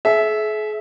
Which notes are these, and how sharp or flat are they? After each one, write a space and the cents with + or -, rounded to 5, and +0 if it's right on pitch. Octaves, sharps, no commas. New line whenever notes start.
G#4 +45 E5 -5